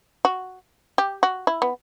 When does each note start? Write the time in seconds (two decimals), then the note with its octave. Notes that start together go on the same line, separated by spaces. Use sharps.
0.25 F#4
0.98 G4
1.23 F#4
1.47 E4
1.62 B3